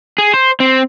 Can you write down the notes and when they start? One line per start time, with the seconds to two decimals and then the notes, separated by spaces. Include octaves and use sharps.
0.18 G#4
0.34 C5
0.60 C4